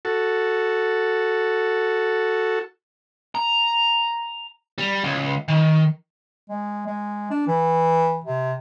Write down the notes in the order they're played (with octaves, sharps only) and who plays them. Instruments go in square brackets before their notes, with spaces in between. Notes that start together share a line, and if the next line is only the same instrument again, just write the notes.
[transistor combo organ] F#4 A4
[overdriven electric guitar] A#5
G3
C#2
D#3
[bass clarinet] G#3
G#3
D4
E3
C3